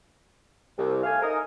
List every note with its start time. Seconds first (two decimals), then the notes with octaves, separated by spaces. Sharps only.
0.77 C2
1.03 A3 F5 G#5
1.22 D#4 A#4 G#5 D#6